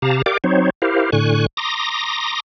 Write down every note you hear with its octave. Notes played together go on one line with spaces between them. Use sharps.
C3 G4 F5 A5 A#5
G4 A#4 D5 F5 G5 D6
F#3 C4 D#4 C5 C#5
E4 G4 A#4 C5 F5
A2 D3 G#5 C#6 F#6
A#5 C6 D6 D#6 A#6